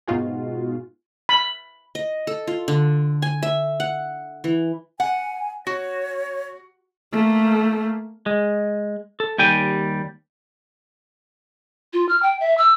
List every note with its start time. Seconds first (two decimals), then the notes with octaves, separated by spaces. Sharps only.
0.08 G#2 B2 D#4 F4 F#4 G#4
1.29 B5
1.95 D#5
2.27 A4
2.47 F4
2.68 D3
3.22 G#5
3.43 E5
3.80 F#5
4.44 E3
5.00 F#5 G#5
5.67 F#4 C#5
7.12 A3 A#3
8.26 G#3
9.20 A4
9.38 D#2 G3 G5 G#5
11.93 F4
12.09 F6
12.23 G5
12.40 E5
12.58 E6